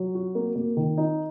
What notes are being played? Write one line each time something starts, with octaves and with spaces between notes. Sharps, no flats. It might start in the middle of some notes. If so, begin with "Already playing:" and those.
Already playing: F#3
F#4
A#3
A#3
D#3
D#4